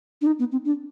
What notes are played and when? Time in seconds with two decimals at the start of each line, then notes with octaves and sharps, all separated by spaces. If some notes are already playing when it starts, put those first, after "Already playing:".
0.21 D4
0.26 D#4
0.39 B3
0.52 C4
0.65 D4